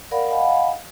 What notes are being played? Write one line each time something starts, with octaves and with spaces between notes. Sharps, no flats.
A#4 D5 F5 F#5 B5
D#5 F5 F#5 G#5 B5